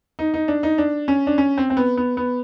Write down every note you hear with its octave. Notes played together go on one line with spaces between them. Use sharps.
D#4
D#4
D4
D#4
D4
C#4
D4
C#4
C4
C4
B3
B3
B3